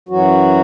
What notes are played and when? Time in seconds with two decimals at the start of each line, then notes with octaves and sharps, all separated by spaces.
0.09 F#2 E3 F#3 F#4